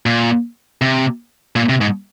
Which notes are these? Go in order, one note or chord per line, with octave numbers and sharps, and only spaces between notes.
A#2
C3
A#2
C3
G#2